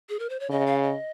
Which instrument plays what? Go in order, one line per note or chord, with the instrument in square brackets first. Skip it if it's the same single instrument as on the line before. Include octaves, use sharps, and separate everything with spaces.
[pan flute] G#4
A#4
C5
C#5
[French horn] C#3 [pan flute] D#5
[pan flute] F5
D#5